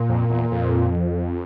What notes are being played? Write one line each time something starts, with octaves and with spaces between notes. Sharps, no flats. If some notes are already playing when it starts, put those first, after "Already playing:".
Already playing: A#2
F2
E2
F2